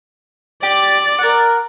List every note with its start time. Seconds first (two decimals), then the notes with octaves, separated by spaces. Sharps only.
0.63 G4 D5
1.19 A#4 F#5